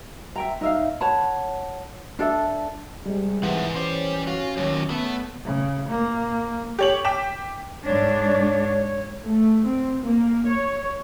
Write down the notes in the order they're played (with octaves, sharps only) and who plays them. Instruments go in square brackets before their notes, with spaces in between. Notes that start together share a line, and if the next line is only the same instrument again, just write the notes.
[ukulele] E5 G5 A#5
D#4 E5 F5
C#5 F#5 A5 B5
D4 A4 E5
[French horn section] C3 G#3 [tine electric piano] G3
[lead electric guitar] G#2 F3 [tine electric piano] E3 [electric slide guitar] G4 E5 F#5
[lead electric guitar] G3 G4 [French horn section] C#4 [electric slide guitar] C5
[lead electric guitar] F4 [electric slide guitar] F#4
[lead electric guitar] D#2 [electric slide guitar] D#3 F3 F#3 [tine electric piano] C#5
[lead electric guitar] A3 [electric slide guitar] B3
[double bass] C#3
A#3
[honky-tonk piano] G4 C#5 F#7
G5 D6 B6 E7
[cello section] G#2 D4 [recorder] C#5
[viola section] A3
C4
A#3
C#5